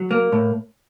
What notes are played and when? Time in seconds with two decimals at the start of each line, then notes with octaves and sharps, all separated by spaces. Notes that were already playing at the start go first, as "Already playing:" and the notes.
Already playing: F#3
0.11 A#3
0.32 A2